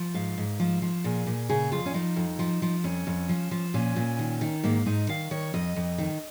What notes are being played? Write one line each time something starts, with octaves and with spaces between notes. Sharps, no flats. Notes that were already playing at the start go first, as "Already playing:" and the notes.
Already playing: F3
G#2 F5
G#2
F3
F3
A#2 G#4
A#2
C#3 G#4
F2 F4
C#4
F3 D#4
F2
F3
F3
F2 C#4
F2
F3
F3
A#2 C#4
A#2
D#3
D#3
G#2 A#3
G#2 D#4
D#3 F5
D#3 C#5
F2 D#5
F2
D#3